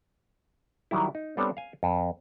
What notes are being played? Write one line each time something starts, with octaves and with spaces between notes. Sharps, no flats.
D#3 F#3 G3 E4
D#4
G3 B3 C4 D4 A4 C#5
F5 G#5
F2